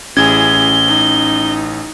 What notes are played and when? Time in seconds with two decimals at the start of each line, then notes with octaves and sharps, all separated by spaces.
0.17 A1 C#4 E4 G#4 G#6 G7
0.88 D#4